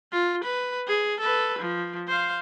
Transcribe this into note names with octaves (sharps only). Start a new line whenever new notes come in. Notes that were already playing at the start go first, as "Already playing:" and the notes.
F4
B4
G#4
A4 B4
F3
C5 F5